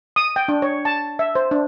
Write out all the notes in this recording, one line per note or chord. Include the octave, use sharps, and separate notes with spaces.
D#6
G5
D4
C#5
A5
E5
C5
D4